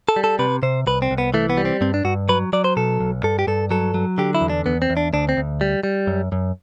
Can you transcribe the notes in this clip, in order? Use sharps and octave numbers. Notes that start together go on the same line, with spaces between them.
A4
G3
A4
C3 B4
C3 C5
C2 B4
C4
C2
B3
E3 A3
B3
G3
C4
G2 C4
D4
G2 F#4
F#3 B4
F#3 D5
C5
B2 A4
B1
G2 A4
G4
G2 A4
F#3 A4
F#3
D3 G4
E4
E2
D4
E2 B3
C4
E2
D4
D2 D4
C4
D2
G3
G3
F#2
F#2